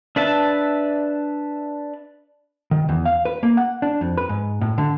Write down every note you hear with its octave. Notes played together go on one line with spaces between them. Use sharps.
D4 B4 E5 A5
D#3
E2
F5
B4
A#3
F#5
D4
F2
B4
G#2
A2
D3